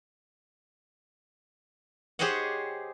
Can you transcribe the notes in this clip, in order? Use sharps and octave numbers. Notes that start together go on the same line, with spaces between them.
G4 G#4 C5 C#5 D#5 F#5